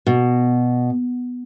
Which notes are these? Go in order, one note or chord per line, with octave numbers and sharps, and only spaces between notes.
B2